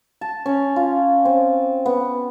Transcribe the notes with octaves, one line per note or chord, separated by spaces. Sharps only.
A5
C#4
F4
C4
B3